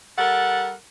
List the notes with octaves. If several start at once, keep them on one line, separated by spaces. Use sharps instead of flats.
G3 A4 A#4 F#5